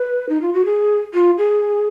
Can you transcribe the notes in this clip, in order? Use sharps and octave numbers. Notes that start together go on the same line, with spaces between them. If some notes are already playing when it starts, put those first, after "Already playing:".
Already playing: B4
D#4
F4
F#4
G#4
F4
G#4